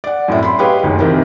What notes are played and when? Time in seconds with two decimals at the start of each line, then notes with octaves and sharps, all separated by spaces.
0.04 D5 F#5
0.28 F#2 A2 C4 E4
0.43 B5 C6
0.59 G4 G#4 B4 C#5 D#5 F5
0.83 F#1 D2 D#3
1.00 C3 D#3 E3 A#4